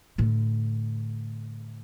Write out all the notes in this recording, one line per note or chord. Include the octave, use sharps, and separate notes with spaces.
A2 D3